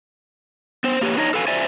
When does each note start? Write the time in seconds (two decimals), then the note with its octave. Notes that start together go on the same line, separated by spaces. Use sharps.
0.84 B3 C5
1.01 A#3 G4 B4 C#5
1.17 D4 D#4 C#5 D#5
1.34 A4 B4 F5 G#5
1.48 C5 D5 E5 G#5